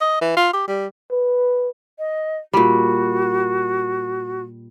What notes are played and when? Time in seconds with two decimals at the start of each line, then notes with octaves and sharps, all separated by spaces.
0.01 D#5
0.21 E3
0.37 F4
0.53 G4
0.68 G3
1.11 B4
1.99 D#5
2.53 A#2 G3 F#4